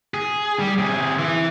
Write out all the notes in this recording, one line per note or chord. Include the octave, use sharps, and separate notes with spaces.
G#4
G3
C3 G#4
E3